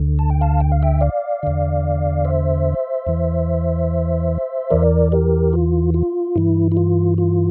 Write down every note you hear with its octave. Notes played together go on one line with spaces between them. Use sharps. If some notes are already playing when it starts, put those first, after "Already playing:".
Already playing: D2 D3
A5
G5
F5 A5
G5
F5
E5 G5
D5 F5
E2 D3
C5 E5
E2 E3
E2 E3 A#4 D5
G4 A#4
F4
F4
G2 E3 E4
E4
F4
F4